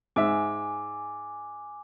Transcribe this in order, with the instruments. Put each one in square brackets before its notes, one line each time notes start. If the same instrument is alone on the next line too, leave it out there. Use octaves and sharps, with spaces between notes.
[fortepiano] G#2 E5 [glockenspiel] G#5 D6